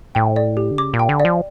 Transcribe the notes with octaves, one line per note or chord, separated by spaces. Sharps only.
A2 G5
D5
G4
D3
C#3 D6
A#2
G5
D3
D5
F3